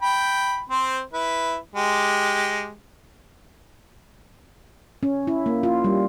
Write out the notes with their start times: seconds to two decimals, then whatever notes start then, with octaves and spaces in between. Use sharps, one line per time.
0.02 G5 B5
0.70 C4 C5
1.13 E4 B4
1.76 G#3 G4
5.03 C#4
5.27 E4
5.46 A#3
5.63 F4
5.84 G3